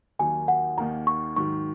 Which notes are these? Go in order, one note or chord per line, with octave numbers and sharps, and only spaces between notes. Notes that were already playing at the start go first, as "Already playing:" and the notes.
D#2 D#3 F#3 A#3 D#4 G#5
F#5
D#2 D#3 A#3 D#4 A#5
C#6
G#2 D#3 F#3 C#6